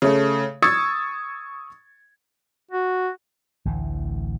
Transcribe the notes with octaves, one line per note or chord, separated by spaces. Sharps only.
C#3 A3
C#6 D#6 E6 G#6 A6 C#7
F#4
A1 D2 A2 E3